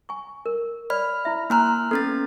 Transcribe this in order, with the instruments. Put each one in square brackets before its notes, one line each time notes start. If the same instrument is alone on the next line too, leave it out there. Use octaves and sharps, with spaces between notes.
[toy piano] G#5 C#6
A#4
[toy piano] C#5 D5 [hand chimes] B5 F6
[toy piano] E4 E5
[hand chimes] A#3 F6 F#6 [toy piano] E4 G#5 A#5
[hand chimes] B3 C#4 A6 [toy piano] A4 C6